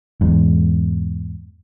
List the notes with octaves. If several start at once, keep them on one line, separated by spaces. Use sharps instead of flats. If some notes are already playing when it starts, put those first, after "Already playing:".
E2 G#2